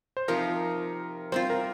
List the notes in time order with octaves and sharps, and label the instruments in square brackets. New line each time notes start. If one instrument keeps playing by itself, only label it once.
[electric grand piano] C5
[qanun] C3 F3 D#4 G4 [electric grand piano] A#4
[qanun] G3 C4 F4 [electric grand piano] C5
[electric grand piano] A#4